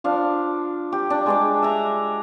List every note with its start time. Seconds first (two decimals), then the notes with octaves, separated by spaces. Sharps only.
0.04 F3 D4 F5
0.92 G4
1.10 D4
1.26 G#3 D4 D5
1.63 E5 A#5